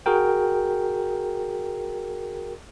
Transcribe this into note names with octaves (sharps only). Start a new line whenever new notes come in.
F#4 G#4 A#4 G5